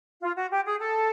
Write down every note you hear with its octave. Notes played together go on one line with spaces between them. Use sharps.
F4
F#4
G4
G#4
A4